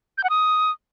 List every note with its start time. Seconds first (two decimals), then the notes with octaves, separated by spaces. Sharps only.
0.18 G6
0.24 F#5
0.30 D#6